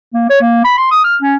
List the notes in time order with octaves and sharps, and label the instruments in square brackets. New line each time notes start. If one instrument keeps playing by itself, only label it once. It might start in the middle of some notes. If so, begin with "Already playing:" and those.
[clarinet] A#3
C#5
A#3
B5
C6
D#6
F6
C#4